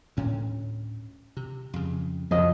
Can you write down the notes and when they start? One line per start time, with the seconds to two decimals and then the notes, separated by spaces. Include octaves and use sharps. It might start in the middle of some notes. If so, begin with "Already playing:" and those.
0.17 D2 A2 C#4
1.37 C3
1.73 F2 C#3
2.31 C2 F2 C#3 F3 F#3 D#5